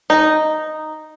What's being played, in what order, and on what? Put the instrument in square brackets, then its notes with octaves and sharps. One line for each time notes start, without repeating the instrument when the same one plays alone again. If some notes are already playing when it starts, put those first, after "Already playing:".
[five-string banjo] D#4